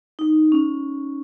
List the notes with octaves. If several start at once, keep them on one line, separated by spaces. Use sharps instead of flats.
D#4
C#4